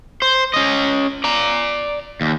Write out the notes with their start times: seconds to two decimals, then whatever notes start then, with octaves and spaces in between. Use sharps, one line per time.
0.22 C5
0.54 C#4 D#5
1.24 D5 A#5
2.21 D#2